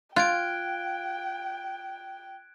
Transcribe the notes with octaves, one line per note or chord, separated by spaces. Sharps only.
F4 G5 F#6 G#6 D7